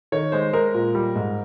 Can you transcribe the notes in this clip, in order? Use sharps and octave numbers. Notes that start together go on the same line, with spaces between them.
D#3 C#5
G#3 C5
G#3 A#4
A#2
G3
G#2